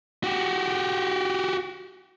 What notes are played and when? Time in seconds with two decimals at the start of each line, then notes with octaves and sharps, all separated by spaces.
0.24 F#4 G4